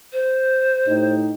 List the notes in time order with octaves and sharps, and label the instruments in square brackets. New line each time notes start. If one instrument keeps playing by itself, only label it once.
[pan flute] C5
[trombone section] A2 D#4 G4